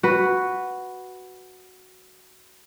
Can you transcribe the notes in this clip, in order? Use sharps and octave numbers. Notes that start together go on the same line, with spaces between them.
F#4 B4